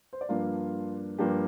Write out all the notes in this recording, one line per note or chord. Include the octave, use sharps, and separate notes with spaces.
C5
D5
G2 F3 A#3 D4 F4 F5
G2 F3 A#3 D4 G4